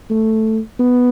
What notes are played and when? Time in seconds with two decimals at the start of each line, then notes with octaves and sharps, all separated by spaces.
0.10 A3
0.80 B3